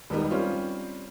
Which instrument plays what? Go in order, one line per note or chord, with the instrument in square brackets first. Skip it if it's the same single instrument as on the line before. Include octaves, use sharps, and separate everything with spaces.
[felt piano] D#1 G#2 G3 B3 D#4
G3 C4 C#4 F4